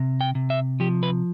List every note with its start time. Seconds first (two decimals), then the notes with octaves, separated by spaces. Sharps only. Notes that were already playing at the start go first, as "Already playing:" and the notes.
Already playing: C3
0.21 G5
0.35 C3
0.50 E5
0.80 F3 G4
1.03 B4